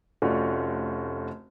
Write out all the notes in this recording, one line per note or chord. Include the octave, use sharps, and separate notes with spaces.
F1 A3 C#4 F4 F#4 D5